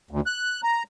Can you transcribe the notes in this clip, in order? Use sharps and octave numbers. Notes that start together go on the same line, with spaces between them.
D2
F#6
A#5